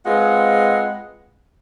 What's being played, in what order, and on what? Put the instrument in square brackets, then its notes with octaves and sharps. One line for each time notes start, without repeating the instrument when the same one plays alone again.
[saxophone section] G#3 C4 F4 B4 F#5